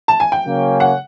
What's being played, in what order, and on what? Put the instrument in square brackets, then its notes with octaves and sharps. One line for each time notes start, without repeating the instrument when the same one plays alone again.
[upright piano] A5
G#5
G5
[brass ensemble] C#3 F#3 A#3 C#4
[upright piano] F#5